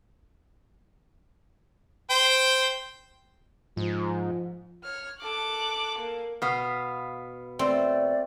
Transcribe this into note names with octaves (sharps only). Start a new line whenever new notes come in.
C5 G5
G#2 F3
C#5 F6
A4 D6 F#6
A#3
B2 B3 F5
A3 C4 D5